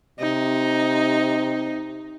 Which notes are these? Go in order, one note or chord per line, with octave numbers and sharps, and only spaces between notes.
C3 D#4